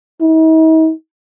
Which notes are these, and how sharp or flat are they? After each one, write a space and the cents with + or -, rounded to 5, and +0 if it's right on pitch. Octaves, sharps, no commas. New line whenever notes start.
D#4 +45